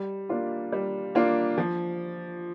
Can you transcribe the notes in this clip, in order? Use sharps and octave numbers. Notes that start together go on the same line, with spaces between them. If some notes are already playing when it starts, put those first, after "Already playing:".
Already playing: G3
A#3 D4 F4
G3
A#3 D4 F4
F3